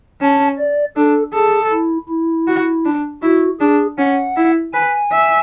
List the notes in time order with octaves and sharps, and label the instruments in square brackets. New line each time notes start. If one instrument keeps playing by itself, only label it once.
[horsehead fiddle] C#4 [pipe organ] A5
[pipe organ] D5
[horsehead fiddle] D4 [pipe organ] A4
[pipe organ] G#4 [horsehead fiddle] A4
[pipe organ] E4
E4
[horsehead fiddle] F#4
D4
[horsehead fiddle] E4 [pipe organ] F#4
[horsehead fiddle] D4 [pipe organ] G#4
[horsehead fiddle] C#4 [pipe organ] F#5
[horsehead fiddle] E4
[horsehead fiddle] B4 [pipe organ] G#5
[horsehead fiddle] E5